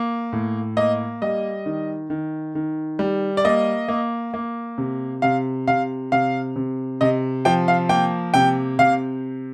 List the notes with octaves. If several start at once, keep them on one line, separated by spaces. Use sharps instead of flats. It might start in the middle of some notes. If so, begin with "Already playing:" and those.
Already playing: A#3
A2
A#3 D#5
G3 D#5
D#3
D#3
D#3
G3
D5
A#3 D#5
A#3
A#3
C3
C3 F5
C3 F5
C3 F5
C3
C3 D#5
F3 G5
F5
A#3 G5
C3 G5
C3 F5